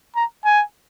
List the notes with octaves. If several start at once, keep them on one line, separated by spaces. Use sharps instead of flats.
A#5
G#5